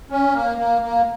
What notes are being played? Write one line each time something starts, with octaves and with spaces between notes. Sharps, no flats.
C#4
A#3
A#3
A#3